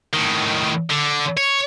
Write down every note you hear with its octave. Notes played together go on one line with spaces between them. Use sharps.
A2 D#3
D3
C#5